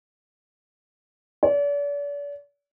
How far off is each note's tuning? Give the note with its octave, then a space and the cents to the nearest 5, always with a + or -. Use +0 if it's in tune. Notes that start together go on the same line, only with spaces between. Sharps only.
D5 -40